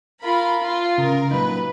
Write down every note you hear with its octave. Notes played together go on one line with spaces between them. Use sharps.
F4 A#4 B5
F4
C#3 A#4
A#2 F#3 D#4 B4